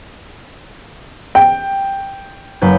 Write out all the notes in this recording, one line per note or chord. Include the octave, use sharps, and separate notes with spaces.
G5
F#1 B4 G6